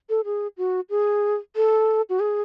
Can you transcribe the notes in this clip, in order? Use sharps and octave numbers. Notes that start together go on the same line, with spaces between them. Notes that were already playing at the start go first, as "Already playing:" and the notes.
A4
G#4
F#4
G#4
A4
F#4
G#4